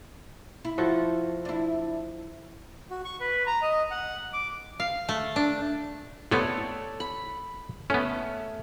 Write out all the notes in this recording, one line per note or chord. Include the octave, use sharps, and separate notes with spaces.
E4
F3 F#4 A4
D4 E4
F#4
C#6
B4
A#5
D#5
F#5
D6
F5
A3
D4
C3 A3 B3 A4 C#5 D5
B5
A3 B3 C#4